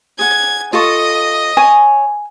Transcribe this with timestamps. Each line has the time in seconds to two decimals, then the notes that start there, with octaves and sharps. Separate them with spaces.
0.19 G#4 F#5 G#6
0.73 F4 A4 D#5 C#6
1.57 C#5 G#5